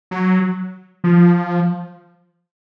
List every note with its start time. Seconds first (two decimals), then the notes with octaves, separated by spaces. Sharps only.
0.11 F#3
1.04 F3